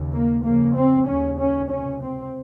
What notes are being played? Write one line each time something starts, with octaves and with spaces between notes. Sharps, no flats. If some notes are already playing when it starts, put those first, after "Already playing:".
Already playing: D#2 C#3
A#3
F2 C#3 A#3
C4
D#2 C#3 C#4
C#4
C#2 C3 C#4
C4